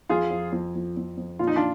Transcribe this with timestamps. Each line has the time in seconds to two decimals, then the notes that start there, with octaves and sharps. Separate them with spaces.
0.09 F2 F4 G#4
0.31 F2
0.52 F2
0.75 F2
0.97 F2
1.17 F2
1.39 A#2 F4
1.47 D#4
1.56 D4 F4